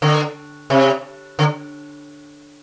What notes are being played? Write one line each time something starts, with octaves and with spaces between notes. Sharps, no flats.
D3
C3
D3